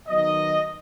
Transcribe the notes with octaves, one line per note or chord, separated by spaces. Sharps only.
D#3 F#3 B3 D#4 D#5